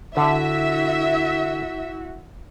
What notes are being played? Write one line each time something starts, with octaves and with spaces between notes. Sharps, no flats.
D3 E4 F#4 E5 A5